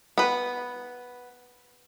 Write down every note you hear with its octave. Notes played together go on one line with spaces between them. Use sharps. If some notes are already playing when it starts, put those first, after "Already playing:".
B3 B4